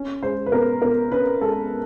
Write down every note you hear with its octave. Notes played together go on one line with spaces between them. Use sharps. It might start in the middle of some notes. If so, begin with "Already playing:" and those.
Already playing: C#4
G#3 C5
B4
B2 A#4
B2 A#4
C#4 B4
G#3 A4